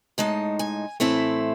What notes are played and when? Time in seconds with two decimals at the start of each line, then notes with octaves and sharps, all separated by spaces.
0.18 A2 G#3 D#4 A5
0.59 G#5
1.00 A2 E3 A3 C4 E4 A5